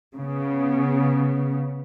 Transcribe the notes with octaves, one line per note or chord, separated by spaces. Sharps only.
C#3 B3